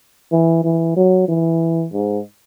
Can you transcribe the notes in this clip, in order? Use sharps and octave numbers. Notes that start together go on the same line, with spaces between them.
E3
E3
F#3
E3
G#2